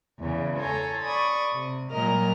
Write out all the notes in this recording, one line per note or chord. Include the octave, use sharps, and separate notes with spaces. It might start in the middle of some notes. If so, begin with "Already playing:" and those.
E2 C#3
A4 C#5 G#5 A#5 C6
D5 B5 C#6 D#6
C3
A#2 F#3 G3 A#4 D#5 F6